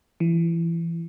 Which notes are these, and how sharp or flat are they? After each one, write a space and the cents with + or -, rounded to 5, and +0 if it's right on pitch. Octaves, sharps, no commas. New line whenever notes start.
E3 +25